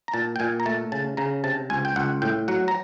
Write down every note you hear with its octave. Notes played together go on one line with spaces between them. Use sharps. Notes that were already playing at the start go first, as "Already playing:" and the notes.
A#5
A#2 A5
G5
A#2 G#5
A#5
A3 A5
C#3 A5
C#3 A#5
C3 A5
C#2 G#5
G5
C#2 F#5
A2 G5
F#3 F#5
A#5